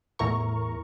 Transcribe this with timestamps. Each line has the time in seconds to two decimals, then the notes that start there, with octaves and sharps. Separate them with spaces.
0.19 E2 A2 E4 A#4 A#5 C#6